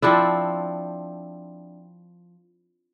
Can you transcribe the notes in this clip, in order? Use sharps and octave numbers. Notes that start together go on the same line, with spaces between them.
F3 C4 D4 E4